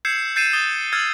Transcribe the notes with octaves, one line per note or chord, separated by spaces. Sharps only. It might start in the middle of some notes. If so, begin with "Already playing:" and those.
E6 G6 G#6 C7 C#7 E7
G6 A6 C7 C#7 D#7 E7
D#6 A6 G7
E6 F6 G#6 A6